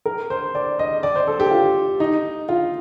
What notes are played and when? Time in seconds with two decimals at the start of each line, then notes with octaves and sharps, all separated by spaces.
0.06 A#4
0.30 C5
0.55 D5
0.79 D#5
1.03 D5
1.16 C5
1.27 A4
1.40 G4
1.51 F4
2.00 D#4
2.49 F4